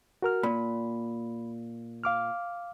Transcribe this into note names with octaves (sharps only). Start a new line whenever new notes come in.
F#4 A#4 F6
A#2 B5
F5 D6 F6